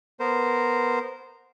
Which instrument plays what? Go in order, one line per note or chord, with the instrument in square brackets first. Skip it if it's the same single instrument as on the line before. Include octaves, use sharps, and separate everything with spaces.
[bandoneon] B3 A#4 C5